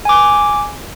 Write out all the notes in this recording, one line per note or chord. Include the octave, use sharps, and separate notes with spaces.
G#5 D6